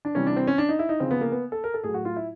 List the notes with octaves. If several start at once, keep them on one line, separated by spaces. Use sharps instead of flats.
D4
C3 E3 G3 C#4
D4
C4
C#4
D4
D#4
E4
D#4
C#3 F3 C4
B3
A#3
B3
A4
A#4
A4
A2 F#3 G#4
F#4
F4
E4